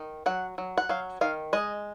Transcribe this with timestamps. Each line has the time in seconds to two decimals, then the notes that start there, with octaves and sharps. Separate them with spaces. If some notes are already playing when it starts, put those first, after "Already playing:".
Already playing: D#3
0.26 F#3 F#5
0.58 F#3
0.77 F#5
0.89 F#3 F5
1.21 D#3 F5
1.53 G#3 D#5